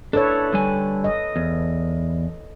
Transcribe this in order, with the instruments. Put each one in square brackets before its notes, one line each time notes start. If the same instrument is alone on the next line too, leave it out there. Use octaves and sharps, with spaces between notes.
[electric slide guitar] D4 E4 [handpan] A4 B4 C#5
[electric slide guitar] D3 G3 G#5
[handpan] D#5
[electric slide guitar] E2